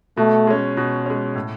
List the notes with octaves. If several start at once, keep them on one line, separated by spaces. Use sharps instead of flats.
B2 A3
G#3 C#4
B2
G#3 C#4
A2